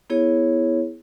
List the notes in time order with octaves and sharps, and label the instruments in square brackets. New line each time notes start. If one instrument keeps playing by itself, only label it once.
[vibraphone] B3 E4 G#4 C#5